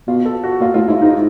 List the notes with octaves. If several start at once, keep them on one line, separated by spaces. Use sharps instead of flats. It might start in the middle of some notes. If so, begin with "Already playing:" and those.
B2 F4
A4
F#4
A#2 F4
A2 F4
G#2 E4
G#2 D#4